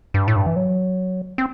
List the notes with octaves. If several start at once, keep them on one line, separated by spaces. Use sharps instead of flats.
G2
A2
G2
E3
F#3
C4